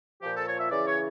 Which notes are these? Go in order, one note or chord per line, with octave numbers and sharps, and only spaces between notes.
A#2 F3 G4
A4
C#5
E5
C#3 E3 D5
C#5